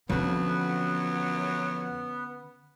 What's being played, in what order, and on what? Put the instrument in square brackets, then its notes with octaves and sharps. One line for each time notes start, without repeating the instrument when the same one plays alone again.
[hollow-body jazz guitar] F2 [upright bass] D3 C#4 [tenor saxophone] F#3 [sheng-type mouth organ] B3